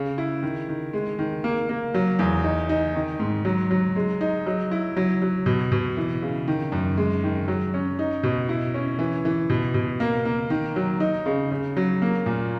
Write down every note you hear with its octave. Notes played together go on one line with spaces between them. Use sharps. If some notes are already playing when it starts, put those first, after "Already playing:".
Already playing: C#3
E4
D#3
D#3
G#3
D#3
A#3
A#3
F#3
E2
D#4
D#4
D#3
G#2
F#3
F#3
G#3
D#4
F#3
E4
F#3
F#3
B2
B2
E3
C#3
D#3
F#2
G#3
D#3
F#3
C#4
D#4
B2
E4
C#4
E3
E3
B2
B2
A#3
A#3
D#3
F#3
D#4
C#3
C#3
F#3
A#3
A#2